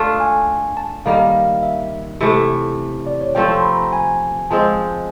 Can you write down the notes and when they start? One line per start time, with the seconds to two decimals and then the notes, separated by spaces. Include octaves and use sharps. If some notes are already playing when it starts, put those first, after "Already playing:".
Already playing: A3 D4 F4
0.20 G#5
0.77 A5
1.06 D#3 G3 A#3 F5
1.63 E5
2.21 C3 E3 A3
3.07 D5
3.21 C#5
3.35 F3 A3 C4 G5
3.52 C6
3.62 B5
3.73 A#5
3.82 A5
3.93 G#5
4.50 F3 G#3 C4 A5